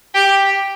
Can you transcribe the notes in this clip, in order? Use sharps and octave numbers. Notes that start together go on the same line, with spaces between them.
G4